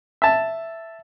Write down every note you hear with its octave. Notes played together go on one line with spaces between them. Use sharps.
E5 A5